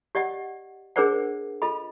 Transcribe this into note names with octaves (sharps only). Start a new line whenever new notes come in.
G4 D5 D#5 F#5
D4 G#4 A#4 C5 D5 F#5
F4 A4 D#5 B5